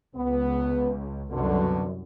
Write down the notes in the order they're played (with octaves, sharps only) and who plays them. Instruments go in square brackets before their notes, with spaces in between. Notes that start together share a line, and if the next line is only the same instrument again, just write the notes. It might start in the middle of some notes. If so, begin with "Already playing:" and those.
[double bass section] C#2 [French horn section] B3
[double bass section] C2 F#2 [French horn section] B2 D3